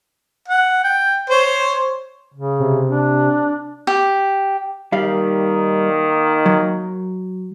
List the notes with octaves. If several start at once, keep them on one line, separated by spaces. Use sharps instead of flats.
F#5
G5
C5 C#5
C#3
C3
D4
G4
D#3 G3 A#3 D#4 F5
F#3